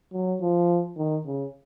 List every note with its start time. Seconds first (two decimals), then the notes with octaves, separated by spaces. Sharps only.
0.14 F#3
0.42 F3
0.97 D#3
1.26 C#3